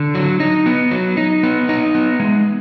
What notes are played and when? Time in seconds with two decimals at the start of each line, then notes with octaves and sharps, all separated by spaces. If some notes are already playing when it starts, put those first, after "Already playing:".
Already playing: D3
0.15 F#3
0.40 D#4
0.66 B3
0.91 F#3
1.17 D#4
1.43 B3
1.69 D#4
1.95 B3
2.20 G#3